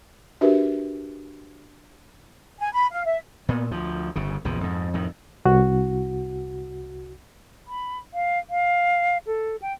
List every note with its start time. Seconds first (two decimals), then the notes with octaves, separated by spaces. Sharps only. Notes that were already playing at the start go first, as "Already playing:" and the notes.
0.41 D4 F#4 G4 A#4 B4 E5
2.59 G#5
2.72 B5
2.92 F5
3.05 E5
3.49 A#2 B3
3.71 D2 F3
4.16 G1 C#3
4.45 A#1 E2 C#3 F3
4.60 F2 G#2
4.94 F2 A2 D#3
5.45 C2 F#4
7.67 B5
8.14 F5
8.50 F5
9.27 A4
9.62 G5